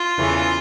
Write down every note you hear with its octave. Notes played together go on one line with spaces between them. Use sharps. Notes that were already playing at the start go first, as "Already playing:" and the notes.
Already playing: F4
E2 C#3 E3 A3